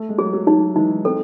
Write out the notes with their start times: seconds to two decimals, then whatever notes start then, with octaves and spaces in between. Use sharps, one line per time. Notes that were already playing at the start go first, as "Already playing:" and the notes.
Already playing: A3
0.09 G#3
0.18 F#3 G#4
0.33 F#3
0.47 F#3 D#4
0.76 E3 G#3 D#4
1.04 G#3 C4 A4